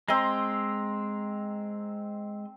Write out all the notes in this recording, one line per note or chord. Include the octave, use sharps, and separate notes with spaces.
G#3 C4 D#5 A#5 C6